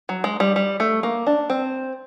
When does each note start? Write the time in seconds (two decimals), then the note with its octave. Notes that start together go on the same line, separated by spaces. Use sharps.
0.09 F#3
0.24 G#3
0.40 G3
0.56 G3
0.80 A3
1.03 A#3
1.27 D4
1.50 C4